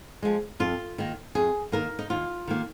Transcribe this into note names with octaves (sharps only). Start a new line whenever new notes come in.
F3 G#3
F2 F4
D#3 A#3
F2 G#4
D#3 A#3 A#4
D#4
D#2 F4
D#3 A#3